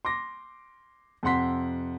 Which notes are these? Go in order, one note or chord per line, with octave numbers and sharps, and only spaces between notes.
C6 D6 A#6
F2 C3 F#5 C6 B6